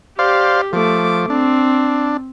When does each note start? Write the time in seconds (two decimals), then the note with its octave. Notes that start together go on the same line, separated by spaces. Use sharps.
0.19 G4 C5 D5 F5
0.73 F3 A3 D6
1.30 C4 D4